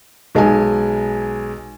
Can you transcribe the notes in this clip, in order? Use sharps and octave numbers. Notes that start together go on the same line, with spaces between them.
B1 G#3 D#5 G#5